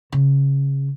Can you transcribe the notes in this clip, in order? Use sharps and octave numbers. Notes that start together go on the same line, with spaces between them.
C#3